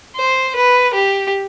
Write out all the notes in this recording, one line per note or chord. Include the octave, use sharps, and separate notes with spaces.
C5
B4
G4